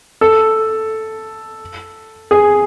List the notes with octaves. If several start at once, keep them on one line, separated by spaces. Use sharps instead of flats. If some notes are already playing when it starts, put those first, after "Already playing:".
A4
G#4